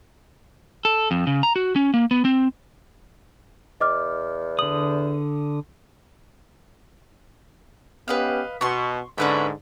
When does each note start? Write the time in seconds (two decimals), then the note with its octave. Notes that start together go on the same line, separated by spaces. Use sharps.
0.85 A4
1.11 F2
1.27 C#3
1.43 A#5
1.56 F#4
1.76 C#4
1.94 A#3
2.11 B3
2.25 C4
3.81 E2 D#5 D6 F6
4.59 D3 D#6 F#7
8.08 B3 C#4 G4 B4 D#5 F5
8.61 B2 C6 C#6
9.18 G#2 D3 C#4 B4 E5